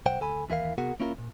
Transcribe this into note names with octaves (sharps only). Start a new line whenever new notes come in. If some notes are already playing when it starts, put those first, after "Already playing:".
B1 C5 F#5 G5
D2 A4 G#5 B5
D#2 E3 E4 A#4 F5
C3 B3 F#4 G#4 A#4 F#5
A#3 C#4 E4 F4 G4 A#4
A#2